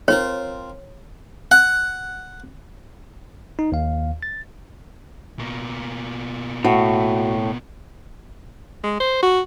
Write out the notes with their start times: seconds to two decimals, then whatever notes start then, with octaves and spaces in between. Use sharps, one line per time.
0.08 C4 F4 A#4 C#5
1.51 F#5
3.59 D#4
3.72 D#2 F5
4.23 A6
5.39 B2 A#3
6.65 A2 F#4
8.84 G#3
9.00 C5
9.23 F#4